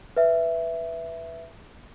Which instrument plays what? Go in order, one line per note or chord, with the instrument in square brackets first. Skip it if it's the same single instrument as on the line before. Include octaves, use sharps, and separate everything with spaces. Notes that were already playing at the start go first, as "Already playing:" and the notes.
[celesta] B4 E5